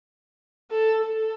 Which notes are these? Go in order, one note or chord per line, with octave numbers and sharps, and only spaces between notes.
A4
A4